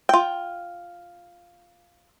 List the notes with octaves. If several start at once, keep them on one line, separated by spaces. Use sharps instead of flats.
F4 G5